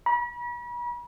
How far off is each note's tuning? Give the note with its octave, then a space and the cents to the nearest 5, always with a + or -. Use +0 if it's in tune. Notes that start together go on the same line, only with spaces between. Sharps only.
B5 -40